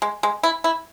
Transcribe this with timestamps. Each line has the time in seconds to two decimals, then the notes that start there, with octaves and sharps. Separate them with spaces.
0.02 G#3
0.23 G#3
0.43 E4
0.64 E4